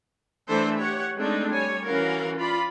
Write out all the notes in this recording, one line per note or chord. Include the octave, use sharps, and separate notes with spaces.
E3 A3 D4 A4 C5 E5
G4 C#5 F#5
G#3 A3 C4 D4 D#4
G3 C#5 G#5
E3 C#4 F#4 A#4 F5
F4 D5 B5